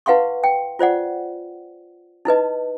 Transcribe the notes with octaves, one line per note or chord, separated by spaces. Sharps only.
E4 B4 F5 F#5 C6 C#6
G5
F4 C5 D5 F#5
D#4 E4 B4 D#5